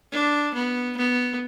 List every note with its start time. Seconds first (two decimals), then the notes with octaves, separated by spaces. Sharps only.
0.12 D4
0.55 B3
0.97 B3